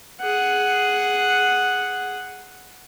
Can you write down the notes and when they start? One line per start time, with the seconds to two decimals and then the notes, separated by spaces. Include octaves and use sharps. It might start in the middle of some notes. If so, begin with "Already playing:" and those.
0.21 G#4 F#5